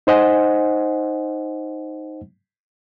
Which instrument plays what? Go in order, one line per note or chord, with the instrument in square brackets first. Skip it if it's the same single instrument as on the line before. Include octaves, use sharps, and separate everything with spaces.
[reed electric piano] D#4 C5 D#5 F#5 G#5